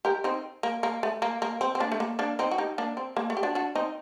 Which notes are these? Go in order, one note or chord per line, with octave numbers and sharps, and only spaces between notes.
G4 A#4
C4 D#4
A#3
A#3
A3
A#3
A#3
C4
C4
A#3 D4
A3
A#3
A#3 D4
C4 D#4
F#4
D#4 G4
A#3 D4
C4
A#3
A3
G4
D4 F#4
D4 F#4
C4 D#4